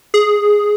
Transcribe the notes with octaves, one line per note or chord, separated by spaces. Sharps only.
G#4